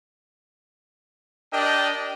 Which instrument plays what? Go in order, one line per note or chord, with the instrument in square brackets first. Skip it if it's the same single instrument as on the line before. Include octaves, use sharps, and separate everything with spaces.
[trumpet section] D4 G4 A#4 D5 D#5 G5